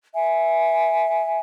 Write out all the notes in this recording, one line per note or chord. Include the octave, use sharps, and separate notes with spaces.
E5 G#5